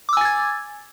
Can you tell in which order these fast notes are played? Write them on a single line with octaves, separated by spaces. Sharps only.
D6 E6 G#5 A6 G#6